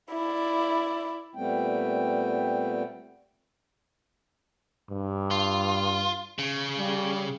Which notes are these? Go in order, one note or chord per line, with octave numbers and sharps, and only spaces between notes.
E4 D5
A#2 G3 A3 B3 C4 G5
G2
F4
C#3
G3